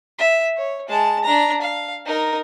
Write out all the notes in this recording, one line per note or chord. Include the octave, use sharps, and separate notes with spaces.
E5
C#5
G#3 A5
D4 A#5
F5
D#4 A#4